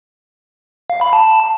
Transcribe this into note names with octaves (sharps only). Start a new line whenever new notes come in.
F5
B5
A5